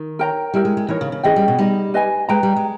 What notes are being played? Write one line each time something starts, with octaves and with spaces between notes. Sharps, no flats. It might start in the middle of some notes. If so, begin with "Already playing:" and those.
Already playing: D#3
A#4 C#5 G5 A#5
G3 E4 G4 A#4
G#3
G#3
E3 D#4 A#4 C#5
C#3
C#3
E3 C#4 G#4 D#5 G5
G3
B2
G3 D#4 G#4 D#5
B4 D#5 G#5
G#3 B4 G5 A#5
G3
G#3